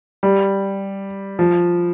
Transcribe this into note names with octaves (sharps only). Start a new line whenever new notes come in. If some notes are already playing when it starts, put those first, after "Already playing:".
G3
F3